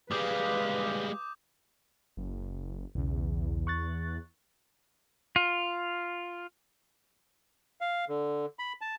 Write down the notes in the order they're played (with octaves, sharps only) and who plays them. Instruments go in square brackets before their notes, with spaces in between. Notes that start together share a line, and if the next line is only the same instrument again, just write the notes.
[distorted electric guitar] G3 G#3 [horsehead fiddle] B4 F5 [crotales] D6 D#6 G6
[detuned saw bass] F#1
[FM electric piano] B1 C#3 [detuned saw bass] E2
[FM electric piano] C#6 F#6 A6
[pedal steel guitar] F4
[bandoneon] F5
D3
B5
A5